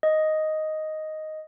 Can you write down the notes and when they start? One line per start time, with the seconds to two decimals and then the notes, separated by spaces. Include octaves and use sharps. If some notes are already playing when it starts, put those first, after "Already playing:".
0.03 D#5